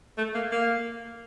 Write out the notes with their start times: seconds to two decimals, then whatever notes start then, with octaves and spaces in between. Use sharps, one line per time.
0.18 A3
0.34 A#3
0.51 A#3